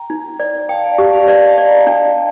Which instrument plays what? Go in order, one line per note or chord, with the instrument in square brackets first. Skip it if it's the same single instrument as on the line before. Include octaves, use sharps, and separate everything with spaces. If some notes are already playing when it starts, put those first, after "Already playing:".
Already playing: [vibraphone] G5 A#5
[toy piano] D#4
D5
[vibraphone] F5 A5 [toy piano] G5
[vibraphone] D5 F5
[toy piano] G4
[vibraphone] D5 F5
[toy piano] D5 [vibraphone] D#5 G5
[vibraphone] F5 A5
[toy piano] D5
[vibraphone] G5 A#5
[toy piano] D4 [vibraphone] F5 A5